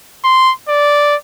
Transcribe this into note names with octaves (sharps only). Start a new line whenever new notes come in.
C6
D5